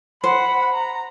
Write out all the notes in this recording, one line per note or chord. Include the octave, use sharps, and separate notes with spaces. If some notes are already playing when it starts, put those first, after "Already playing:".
C5 F#5 B5
A#5